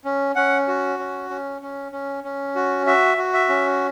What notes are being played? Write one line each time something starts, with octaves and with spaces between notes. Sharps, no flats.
C#4
C#4 F#5
F#4
C#4
C#4
C#4
C#4
C#4
F#4
F#4 E5
F#4
E5
C#4